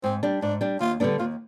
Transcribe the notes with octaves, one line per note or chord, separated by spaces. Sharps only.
G#2 C4
G3 D4
G#2 D4
G3 D4
D#2 F4
D3 G3 B3 D4
D#2 F4